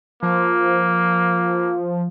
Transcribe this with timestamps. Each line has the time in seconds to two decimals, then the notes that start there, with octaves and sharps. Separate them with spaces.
0.23 F3 A#3